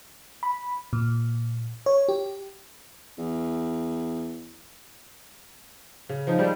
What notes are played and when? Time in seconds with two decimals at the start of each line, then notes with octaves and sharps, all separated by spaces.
0.43 B5
0.93 A#2
1.86 C#5
2.09 G4
3.18 E2
6.09 C#3
6.27 F3 D#4
6.38 G3 G#3 D#4 G4